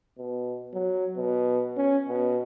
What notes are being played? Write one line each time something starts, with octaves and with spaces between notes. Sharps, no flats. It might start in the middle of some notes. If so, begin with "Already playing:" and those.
B2
F#3
B2
C#4
B2